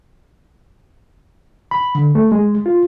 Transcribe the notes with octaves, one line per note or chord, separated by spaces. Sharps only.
B5
D3
A3
G#3
F4